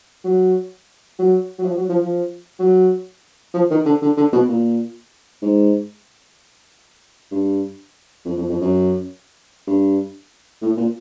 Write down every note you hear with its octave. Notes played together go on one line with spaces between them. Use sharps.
F#3
F#3
F#3
F3
F#3
F3
F3
F#3
F3
D#3
D3
D3
D3
B2
A#2
G#2
G2
F2
F2
F2
F#2
G2
A2
A#2